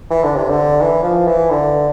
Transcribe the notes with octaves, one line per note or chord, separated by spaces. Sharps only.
E3
D3
C3
D3
E3
F3
E3
D3